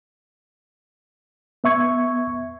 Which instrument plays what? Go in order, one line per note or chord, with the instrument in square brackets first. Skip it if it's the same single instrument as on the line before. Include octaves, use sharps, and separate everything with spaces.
[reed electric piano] B3 E5 C#6 G#6